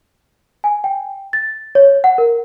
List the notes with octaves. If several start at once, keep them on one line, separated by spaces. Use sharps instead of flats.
G#5
G5
A6
C#5
F#5
A#4